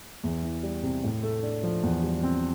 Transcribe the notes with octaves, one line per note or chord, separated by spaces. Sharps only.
E2
E3
G3
C3
A2
A3
D4
F3
E2
G3
C4